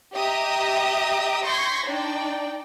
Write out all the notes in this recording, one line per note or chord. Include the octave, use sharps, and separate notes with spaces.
G4 D#5 E5 A#5 D#6
C6 C#6 G6 G#6 A#6 B6
D4 D#4 D5 G5